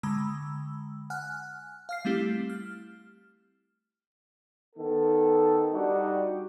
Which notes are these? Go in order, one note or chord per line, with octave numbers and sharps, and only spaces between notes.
D3 G#3 A#5 B5 E6
F#5 G#5 F6 F#6
F5 F6 C7
G3 A3 C4 E4 G4
F6
D#3 B3 A4
G3 D4 D#4 F#4 G4